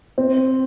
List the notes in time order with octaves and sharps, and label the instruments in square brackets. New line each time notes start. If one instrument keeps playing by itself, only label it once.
[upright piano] C4